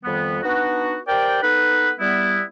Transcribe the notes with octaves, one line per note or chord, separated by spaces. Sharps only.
F2 D#3 G3 B3
B3 D4 D#4 F#4
G4 A#4 C5 D5 G5
B3 D#4 A4 B4
G3 B3 E4